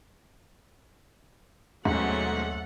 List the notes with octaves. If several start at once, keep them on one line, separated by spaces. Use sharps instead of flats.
D#2 G#2 B2 F#3 A3 C#4 A4 F#5